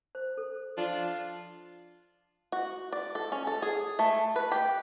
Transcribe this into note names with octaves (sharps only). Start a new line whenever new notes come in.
C5
A4
F3 D4 F4
F#4
D5
A4
C#4
A4
G#4
A3
B4
G4